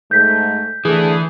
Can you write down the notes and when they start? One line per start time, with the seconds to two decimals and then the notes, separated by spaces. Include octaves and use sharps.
0.11 G#2 A3 G6 B6
0.85 D3 E3 A3 G#4